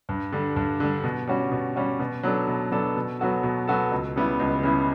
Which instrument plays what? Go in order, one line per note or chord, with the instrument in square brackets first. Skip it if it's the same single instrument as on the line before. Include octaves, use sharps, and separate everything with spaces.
[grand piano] G2
D3 G3
G2
D3 G3
B2
G3 C#4 F#4
B2
G3 C#4 F#4
B2
F#3 B3 D4 A4
B2
F#3 B3 D4 A4
B2
F#3 B3 F#4 A4
B2
F#3 B3 F#4 A4
C#2
C#3 G3 B3 E4
C#2
C#3 G3 B3 E4